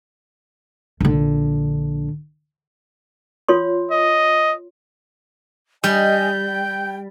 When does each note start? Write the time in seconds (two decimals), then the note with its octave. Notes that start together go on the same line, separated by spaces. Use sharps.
1.01 A#1 D3
3.49 F4 C#5 C6
3.91 D#5
5.84 G3 D#5 G#5 G6
6.49 G5